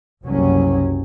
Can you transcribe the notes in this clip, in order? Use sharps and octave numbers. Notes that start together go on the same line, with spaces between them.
F#1 C2 F#3 C#4